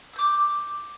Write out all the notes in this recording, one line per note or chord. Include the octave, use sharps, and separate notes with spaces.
D6 E6 G6